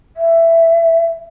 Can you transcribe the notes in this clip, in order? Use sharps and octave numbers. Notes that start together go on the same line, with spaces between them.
E5